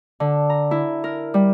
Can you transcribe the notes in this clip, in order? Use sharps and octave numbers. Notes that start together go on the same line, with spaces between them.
D3
A#5
E4
A#4
G3